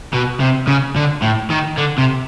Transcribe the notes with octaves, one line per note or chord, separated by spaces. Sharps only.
B2
C3
C#3
D3
A2
D#3
D3
C3